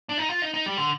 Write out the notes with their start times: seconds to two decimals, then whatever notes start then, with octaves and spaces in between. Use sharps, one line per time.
0.09 D4
0.18 D#4
0.30 F4
0.42 D#4
0.54 D#4
0.66 G3
0.78 D3